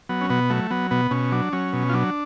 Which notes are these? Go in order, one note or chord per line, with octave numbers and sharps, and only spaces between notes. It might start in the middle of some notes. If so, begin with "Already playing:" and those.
F#3 B3
C#4
B2 B3
F#3 A3
F#3 B3
B2 B3
B2 C#4
F#3 D4
F#3 C#4
B2
F4
F#3 D4